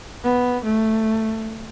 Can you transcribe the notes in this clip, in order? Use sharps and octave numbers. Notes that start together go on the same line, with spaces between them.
B3
A3